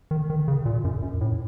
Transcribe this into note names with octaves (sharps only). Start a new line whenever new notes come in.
D#3
D#3
C#3
A#2
F#2
F#2
A2